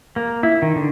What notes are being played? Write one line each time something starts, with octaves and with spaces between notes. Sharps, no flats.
A#3
E4
D#3
D3